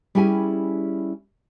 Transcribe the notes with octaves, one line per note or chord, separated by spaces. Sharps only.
G3 C#4 E4 G4 G#4 G#5